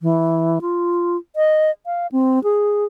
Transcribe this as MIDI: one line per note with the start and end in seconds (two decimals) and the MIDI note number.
0.01 0.59 52
0.61 1.17 65
1.36 1.71 75
1.86 2.07 77
2.12 2.42 60
2.44 2.85 68